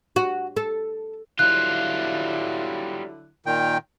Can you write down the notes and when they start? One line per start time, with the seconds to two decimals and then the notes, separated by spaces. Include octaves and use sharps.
0.16 F#4
0.57 A4
1.39 D3 F#3 G3 E4 F4 F#6
3.46 A#2 D#3 G5